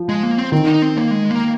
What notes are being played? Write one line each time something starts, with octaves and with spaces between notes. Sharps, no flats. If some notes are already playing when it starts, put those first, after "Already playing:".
Already playing: F3
G#3
A#3
C4
D#3 C4
D#4
C4
A#3
G#3
A#3